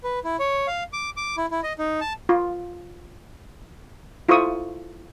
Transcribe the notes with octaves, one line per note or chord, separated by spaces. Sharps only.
B4
E4
C#5
F5
D6
D6
E4
E4
D#5
D#4
A5
F4
E4 F4 A4 C5 C#6 D#6